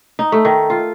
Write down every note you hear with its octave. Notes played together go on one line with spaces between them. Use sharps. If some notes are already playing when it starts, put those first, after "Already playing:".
D#4
A3
D#3
F4